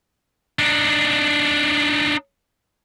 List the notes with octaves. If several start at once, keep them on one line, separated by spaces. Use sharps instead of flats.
D4 D#4